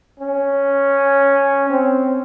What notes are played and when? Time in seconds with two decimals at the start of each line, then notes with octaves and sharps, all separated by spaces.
0.19 C#4
1.70 C4